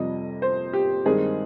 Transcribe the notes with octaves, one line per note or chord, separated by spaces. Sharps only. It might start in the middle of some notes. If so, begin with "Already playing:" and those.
Already playing: F2 C3 G3 D#5
C5
G4
G2 D#3 G#3 C4 D#4 G#4